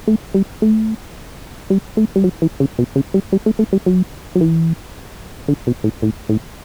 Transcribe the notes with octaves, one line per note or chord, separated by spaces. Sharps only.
A3
G3
A3
G3
A3
G3
F#3
E3
C#3
B2
C#3
G3
G3
A3
A3
G3
F#3
F#3
E3
D3
B2
A2
A2
A2